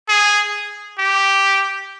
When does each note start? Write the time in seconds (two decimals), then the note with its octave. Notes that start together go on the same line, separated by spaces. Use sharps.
0.09 G#4
0.99 G4